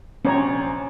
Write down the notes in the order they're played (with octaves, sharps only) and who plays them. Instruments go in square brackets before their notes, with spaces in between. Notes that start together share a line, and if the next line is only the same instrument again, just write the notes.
[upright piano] A#1 A#5 [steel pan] C4 C#5 [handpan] C#4